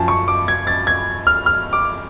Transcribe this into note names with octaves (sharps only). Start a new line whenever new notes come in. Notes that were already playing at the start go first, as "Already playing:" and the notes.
Already playing: F#2 F3 A5
C#6
D6
G#6
A6
G#6
F6
F6
D6